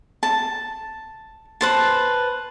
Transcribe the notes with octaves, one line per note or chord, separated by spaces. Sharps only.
A5
B4 C5 A5